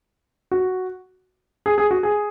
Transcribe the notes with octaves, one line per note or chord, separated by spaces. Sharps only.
F#4
G#4
G#4
F#4
G#4